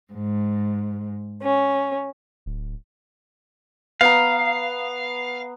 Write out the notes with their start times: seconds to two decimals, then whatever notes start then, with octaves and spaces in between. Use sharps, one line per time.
0.14 G#2
1.42 C#4
2.46 D1
4.01 B3 F5 A#5